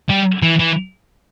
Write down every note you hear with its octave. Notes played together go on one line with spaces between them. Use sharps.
G3
E3
E3